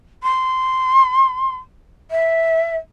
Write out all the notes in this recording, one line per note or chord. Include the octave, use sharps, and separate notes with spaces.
C6
E5